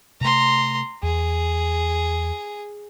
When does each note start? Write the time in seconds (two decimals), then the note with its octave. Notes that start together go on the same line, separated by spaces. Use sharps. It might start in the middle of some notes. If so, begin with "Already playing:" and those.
0.21 C3 A3 A#5 C6
1.03 E2 G#4